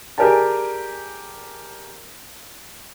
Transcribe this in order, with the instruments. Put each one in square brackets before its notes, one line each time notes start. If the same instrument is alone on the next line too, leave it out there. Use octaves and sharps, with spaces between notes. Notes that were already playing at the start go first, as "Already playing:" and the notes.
[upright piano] G4 G#4 A#4 D5 G#5 A5